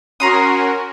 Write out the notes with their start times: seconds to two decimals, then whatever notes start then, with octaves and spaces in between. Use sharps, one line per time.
0.20 C#4 F#4 A#4 A#5 C6 D#6